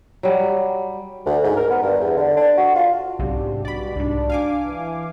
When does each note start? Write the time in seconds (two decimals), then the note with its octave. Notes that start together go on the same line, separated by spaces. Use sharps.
0.23 F#3 G3
1.26 D2
1.44 G#2
1.57 A#4
1.70 B3
1.83 G2
2.01 E2
2.17 D3
2.37 D4
2.58 F#4
2.76 F4
3.19 B1 G#2 C3 D4 G4
3.65 B2 G3 F#4 D5 B5
3.96 C2 G#2 D4
4.30 F5 G#5 D6
4.65 E3